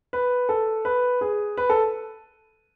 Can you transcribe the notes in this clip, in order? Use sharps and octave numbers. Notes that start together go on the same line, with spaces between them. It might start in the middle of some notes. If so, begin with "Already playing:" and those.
B4
A4
B4
G#4
B4
A4